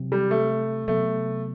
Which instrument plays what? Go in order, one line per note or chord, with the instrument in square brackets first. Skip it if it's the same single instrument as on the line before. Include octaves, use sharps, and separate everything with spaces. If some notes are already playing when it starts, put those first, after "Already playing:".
Already playing: [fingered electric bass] C3 F#3 C4
[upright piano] G3
A3
[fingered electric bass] C3 F#3 B3 [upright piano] A3